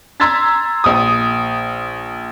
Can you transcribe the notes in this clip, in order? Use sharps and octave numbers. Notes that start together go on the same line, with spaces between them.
A#5 C6 E6 G#6 A6 B6
A#1 D#6